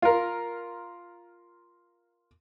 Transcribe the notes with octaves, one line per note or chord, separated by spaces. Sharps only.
F4 A#4